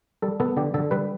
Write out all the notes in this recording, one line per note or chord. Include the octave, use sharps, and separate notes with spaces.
G3 A4
B3 A4
D3 G4
D3 A4
G3 B4